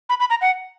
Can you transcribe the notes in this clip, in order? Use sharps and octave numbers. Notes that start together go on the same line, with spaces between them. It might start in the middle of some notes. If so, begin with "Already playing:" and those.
B5
B5
A#5
F#5